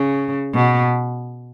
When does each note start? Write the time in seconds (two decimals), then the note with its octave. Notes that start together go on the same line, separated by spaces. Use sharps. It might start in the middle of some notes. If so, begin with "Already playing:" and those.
Already playing: C#3
0.54 B2